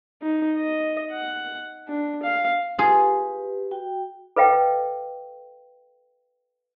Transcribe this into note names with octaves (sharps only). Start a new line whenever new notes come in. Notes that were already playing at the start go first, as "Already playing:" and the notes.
D#4
D#5
F#5
D4
F5
F4 G4 G#4 B4
F#4 G5
A4 B4 D#5 F5 G5